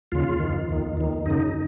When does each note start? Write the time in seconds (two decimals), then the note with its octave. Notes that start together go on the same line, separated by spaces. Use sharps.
0.12 D#2 C#3 F4
0.40 F2 D#3
0.69 D#2 D#3
0.97 D#2 D#3
1.26 F#2 C#3 D#4